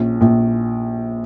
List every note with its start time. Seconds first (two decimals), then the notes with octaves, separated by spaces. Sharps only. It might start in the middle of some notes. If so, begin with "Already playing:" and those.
Already playing: A#1 C#4
0.21 A#1